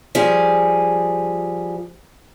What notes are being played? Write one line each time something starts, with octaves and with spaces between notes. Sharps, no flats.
F3 G3 G#4